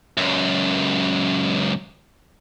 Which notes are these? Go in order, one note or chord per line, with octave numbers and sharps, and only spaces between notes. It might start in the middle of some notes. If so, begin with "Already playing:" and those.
C#2 F#2